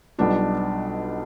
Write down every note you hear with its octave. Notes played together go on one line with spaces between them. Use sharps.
B1 B2 G3 D4 F4